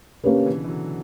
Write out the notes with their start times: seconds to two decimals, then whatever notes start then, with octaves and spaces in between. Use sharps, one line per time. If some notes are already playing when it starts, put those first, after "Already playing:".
0.23 B2 D3 A#3 C#4 G4 B4
0.46 C#3 E3
0.64 E3
0.68 D3 F#3